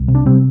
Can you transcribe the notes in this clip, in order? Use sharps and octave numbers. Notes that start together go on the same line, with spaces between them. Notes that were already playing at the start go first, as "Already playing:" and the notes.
Already playing: C2
C3
D4
C3 G3 C4